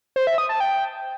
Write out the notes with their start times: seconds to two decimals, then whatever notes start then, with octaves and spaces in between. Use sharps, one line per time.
0.16 C5
0.27 E5
0.38 D#6
0.49 A5
0.60 G5